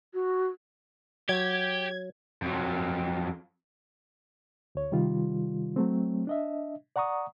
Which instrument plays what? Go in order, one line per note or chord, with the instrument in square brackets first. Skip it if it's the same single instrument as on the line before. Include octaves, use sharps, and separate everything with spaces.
[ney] F#4
[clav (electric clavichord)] F#3 [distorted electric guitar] G4 [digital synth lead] G#6
[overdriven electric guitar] F2 F#3
[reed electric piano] D2 C#5
C3 D#3 G3 F4
F#3 A3 C4
D4 D#5 E5
D5 F#5 A#5 C#6 D#6